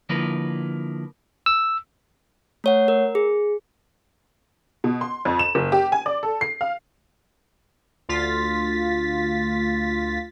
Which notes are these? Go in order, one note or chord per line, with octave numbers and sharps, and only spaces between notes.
D3 F3 A#3 E4 A#4 B4
E6
A3 C#5 F#5
A#4
G#4
B2
C6
F2
E7
F#1
G4
G#5
D5
A4
C7
F5
D2 F4 A6 B6